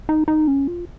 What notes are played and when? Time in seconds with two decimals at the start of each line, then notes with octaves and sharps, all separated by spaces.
0.09 D#4
0.28 D#4
0.47 C#4
0.67 F4